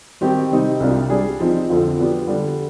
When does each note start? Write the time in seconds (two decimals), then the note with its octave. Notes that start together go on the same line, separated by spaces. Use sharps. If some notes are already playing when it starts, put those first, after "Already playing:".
0.21 D#3 G3 C4 G4
0.52 C3 G3 C4 D#4
0.80 C2 C3 G3 D4 F4
1.10 G3 D4 G#4 D5
1.40 F3 C4 D#4
1.69 F2 D3 F3 C4 F4
1.98 F3 B3 D4 G4
2.27 D3 G3 D4